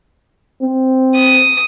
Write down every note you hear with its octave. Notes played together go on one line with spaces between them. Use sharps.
C4
D#6